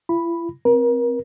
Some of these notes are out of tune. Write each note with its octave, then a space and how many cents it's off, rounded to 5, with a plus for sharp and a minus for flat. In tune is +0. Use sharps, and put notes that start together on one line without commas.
E4 +45 B5 +0
C4 +0 A#4 +35